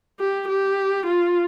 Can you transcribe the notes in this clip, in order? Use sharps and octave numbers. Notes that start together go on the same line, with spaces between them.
G4
G4
F4